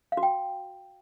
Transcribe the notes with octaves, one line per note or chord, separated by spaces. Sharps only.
F5
F#4
G5